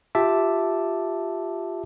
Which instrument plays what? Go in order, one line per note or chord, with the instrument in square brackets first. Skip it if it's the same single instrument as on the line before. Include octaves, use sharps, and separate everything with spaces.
[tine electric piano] F4 G4 E5 A5 D6